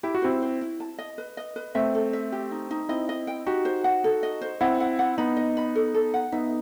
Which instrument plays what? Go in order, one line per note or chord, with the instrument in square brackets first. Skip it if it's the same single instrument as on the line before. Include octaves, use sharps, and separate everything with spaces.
[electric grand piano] E4 [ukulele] G4
[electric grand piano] F#4
[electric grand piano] C4 E4 [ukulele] C5
[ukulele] C5
E4
A5
D#5
B4
D#5
B4
[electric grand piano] A3 C4 [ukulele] E5
[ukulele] A4
E5
G4
D#4
D#4
[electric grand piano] C4 E4 [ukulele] D#5
[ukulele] D#5
G5
[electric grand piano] D#4 F#4 [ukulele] G4
[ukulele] C5
F#5
A4
D#5
C5
[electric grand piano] C4 E4 [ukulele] F#5
[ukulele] F#5
F#5
[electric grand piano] B3 D#4 [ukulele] B5
[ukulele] D#5
B5
A4
A4
F#5
[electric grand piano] B3 D#4 [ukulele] E5